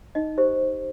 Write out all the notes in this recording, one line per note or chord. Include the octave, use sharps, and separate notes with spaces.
D#4 D#5
G4 C5